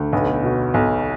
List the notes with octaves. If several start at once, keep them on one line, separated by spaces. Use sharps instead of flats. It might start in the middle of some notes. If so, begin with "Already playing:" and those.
Already playing: D2
B1 B3
B2
B1